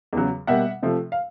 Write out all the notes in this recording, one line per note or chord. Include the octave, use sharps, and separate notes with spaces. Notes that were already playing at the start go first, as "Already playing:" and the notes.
E2 C#3 F#3
B2 G3 A#3 E5 F#5
C3 F3 A3
F5